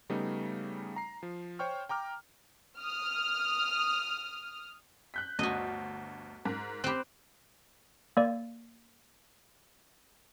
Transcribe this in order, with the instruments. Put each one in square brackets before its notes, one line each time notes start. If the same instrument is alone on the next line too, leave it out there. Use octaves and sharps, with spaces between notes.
[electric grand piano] C#3 G3 A3 B3 D#4
A#5 C7
F3
C5 C#5 G5 C#6 F6
G5 A#5 D6 F6
[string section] D#6 F6
[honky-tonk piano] F#6 G6 B6
[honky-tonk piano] G1 D2 [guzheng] F#4 D#5
[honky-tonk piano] G#2 A#4
[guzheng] C4 G4 [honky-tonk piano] B5 F#6
[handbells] A#3 D5